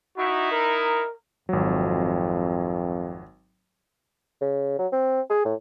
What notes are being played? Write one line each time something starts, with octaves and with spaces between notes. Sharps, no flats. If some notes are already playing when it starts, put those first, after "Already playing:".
D#4 E4 F#4
A#4
G#1 F2 F#3
C#3
F#3
C4
G#4
A2